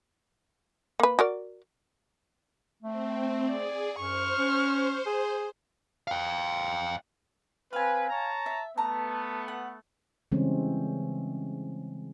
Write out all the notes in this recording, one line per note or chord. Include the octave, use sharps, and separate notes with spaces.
A#3 B4
F#4 A#4 D5
A3 C4
G#4 D5
F#2 C5 C#6 F6
C#4
G#4
F5 G5
C4 B4 F5 G#5
C#5 A5 A#5
E5
A3 B3 A5 A#5
F#5
C#3 E3 G3 G#3 C4 C#4